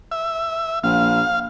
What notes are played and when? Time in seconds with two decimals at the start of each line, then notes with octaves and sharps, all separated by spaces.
0.11 E5
0.84 A#1 F5